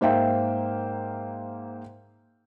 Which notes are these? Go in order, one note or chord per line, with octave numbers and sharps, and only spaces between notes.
G#2 A#3 C5 E5 F5 G5